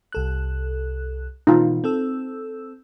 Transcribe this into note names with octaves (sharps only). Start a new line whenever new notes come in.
C2 A4 F#6
B2 E3 D#4 F4
C4 A4 E6